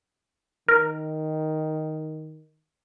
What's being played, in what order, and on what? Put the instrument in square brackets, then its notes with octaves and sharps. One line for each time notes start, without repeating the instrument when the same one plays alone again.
[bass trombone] D#3 [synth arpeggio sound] A#4